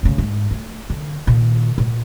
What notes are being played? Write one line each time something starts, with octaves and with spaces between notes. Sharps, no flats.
A2 C#3
G#2
A3
D3
A#2 D#3
A#2